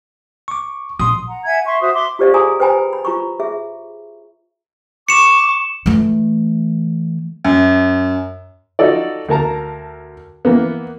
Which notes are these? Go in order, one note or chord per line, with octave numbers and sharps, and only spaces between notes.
C#6 D6
A#1 C6 D#6
F#5 A#5
E5 F#5 G#5 G#6
E5 C6 C#6
F#4 C5 E5 D#6
E5 C6 D6
F4 G4 C5 D5 D#5 F5
G#4 G#5 A#5 D#6
B4 C5 G5 G#5 A#5 B5
B5
F4 A#5 B5 C#6
G#4 E5
C#6 D6 C#7 E7
E3 A3
F#2
D#4 F4 F#4 A4 D5
D2 A#4 A5 A#5
E3 A#3 B3